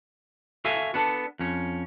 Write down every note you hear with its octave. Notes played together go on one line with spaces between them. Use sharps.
F#4 A4 E5 F5 G#5
B3 D4 A4
F2 C#4